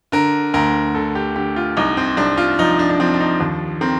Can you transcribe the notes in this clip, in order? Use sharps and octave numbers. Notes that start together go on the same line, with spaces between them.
D3 A#4
D2 A#4
D3 A4
G4
D3 G4
F4
C2 D#4
C4
C2 D4
F4
F3 D#4
D4
D4
F3 C4
D4
D#4
D#2 D4
D#3 C4